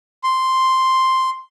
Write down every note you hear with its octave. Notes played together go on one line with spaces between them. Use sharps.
C6